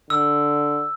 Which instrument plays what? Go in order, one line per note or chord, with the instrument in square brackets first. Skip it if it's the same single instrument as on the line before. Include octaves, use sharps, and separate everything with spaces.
[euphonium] D3 [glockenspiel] E6